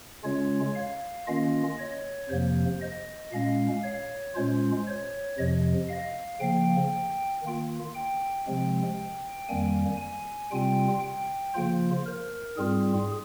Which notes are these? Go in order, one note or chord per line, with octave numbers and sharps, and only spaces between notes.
C#3 G#3 C#4 F4 C#5
F5
D#3 A#3 C#4 F4 D#5
C#5
F2 C3 F3 A#3 C5
D#5
A#2 G#3 C#4 F5
C#5
A#2 G#3 C#4 F4 C5
C#5
F2 C3 F3 D#5
F5
C#3 F3 A#3 G5
D#3 A#3 F4
G5
C3 F3 G#3 C4
F2 D#3 G3 A#3 G#5
G#5
C3 G3 C4 F4 G5
G5
C#3 F3 A#3 F4 C5
A#4
G#2 G3 C4 F4 G#4